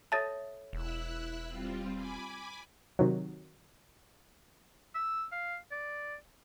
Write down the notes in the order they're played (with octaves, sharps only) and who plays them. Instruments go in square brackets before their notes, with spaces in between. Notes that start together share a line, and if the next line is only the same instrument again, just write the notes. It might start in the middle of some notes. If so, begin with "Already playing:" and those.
[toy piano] A4 C#5 E5 [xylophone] A5 A6
[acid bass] E1 [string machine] E4 E6 F#6
[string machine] G3 C4 F4
G#5 B5 D6
[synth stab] C3 D#3 F#3
[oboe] E6
F5
D5